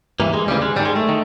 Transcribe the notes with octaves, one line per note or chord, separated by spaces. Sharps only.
G2 E3 A#3
G#3
D2 C#3 E3 G3
G#3
G#2 D#3 G3
G#3
A3
D#3